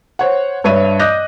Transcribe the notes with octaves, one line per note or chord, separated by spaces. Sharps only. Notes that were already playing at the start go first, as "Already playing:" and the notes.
C5 C#5 F#5
G2 B4 C#5 E5 D#7
D#5 D6 D#6 F#6 G6 A#6